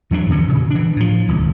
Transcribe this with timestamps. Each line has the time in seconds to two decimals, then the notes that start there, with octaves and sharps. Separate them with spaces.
0.11 E2 F#3 A#3 D4
0.28 E2 D3 E3 C#4
0.48 A#2 C#3
0.71 E3 D4
0.96 A2 F3
1.28 D#1 C#2